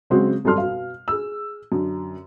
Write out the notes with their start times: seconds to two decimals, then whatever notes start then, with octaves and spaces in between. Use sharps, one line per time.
0.10 C#3 F#3 G#3 C4 F#4
0.45 G#1 F#2 G3 A4 C6 F6
0.58 B2 F5
1.08 G#4 E6
1.72 F#2 D3